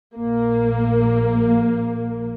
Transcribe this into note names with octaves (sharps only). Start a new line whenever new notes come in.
A#1 A#3